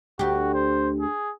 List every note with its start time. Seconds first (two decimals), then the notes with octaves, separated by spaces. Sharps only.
0.19 D2 F#4 G4
0.54 C5
1.00 G#4